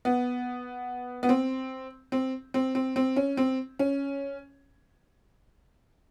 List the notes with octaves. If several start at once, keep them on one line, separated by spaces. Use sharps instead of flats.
B3
B3
C4
C4
C4
C4
C4
C#4
C4
C#4